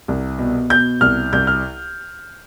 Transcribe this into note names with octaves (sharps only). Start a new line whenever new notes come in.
C2
B2
B2 G6
C2 F6
C2 G6
F6